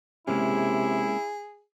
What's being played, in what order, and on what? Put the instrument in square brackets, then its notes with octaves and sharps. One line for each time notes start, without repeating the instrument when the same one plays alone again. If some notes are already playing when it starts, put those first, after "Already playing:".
[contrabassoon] C3 [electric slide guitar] G#3 A#3 C#4 [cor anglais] E4 [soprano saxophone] G#4